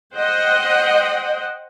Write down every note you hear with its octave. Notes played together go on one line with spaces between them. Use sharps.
C5 D#5 F#5 G5